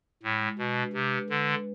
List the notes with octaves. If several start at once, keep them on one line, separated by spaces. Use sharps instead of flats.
A2 G#3
G#3
B2 B4
D4
C3 G#3
B4
D3 B4
G#3